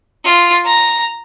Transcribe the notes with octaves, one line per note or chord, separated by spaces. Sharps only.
F4
A#5